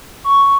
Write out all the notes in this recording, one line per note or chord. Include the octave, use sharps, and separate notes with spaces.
C#6